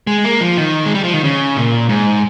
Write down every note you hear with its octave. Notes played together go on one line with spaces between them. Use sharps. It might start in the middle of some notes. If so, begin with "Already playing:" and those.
G#3
A#3
F3
D#3
G#3
G3
F3
D#3
C#3
A#2
G#2